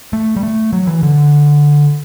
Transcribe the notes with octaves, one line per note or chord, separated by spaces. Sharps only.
A3
G3
A3
F#3
E3
D3